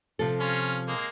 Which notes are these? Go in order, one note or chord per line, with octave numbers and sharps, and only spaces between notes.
C3 F3 A4
C#4 F4
G#3 A#3